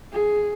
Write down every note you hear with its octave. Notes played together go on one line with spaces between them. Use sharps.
G#4